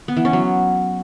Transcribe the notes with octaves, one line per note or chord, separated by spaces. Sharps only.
B3
E3
C#4
F#3